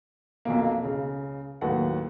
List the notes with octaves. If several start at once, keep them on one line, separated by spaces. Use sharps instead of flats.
B1 F2 B2 A#3
C#2 C#3
D#2 A2 F#3 B4 F#5